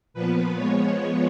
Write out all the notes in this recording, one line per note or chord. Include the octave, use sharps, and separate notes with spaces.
A#2 F3 B3 B4
F3 G#3 B3 C#5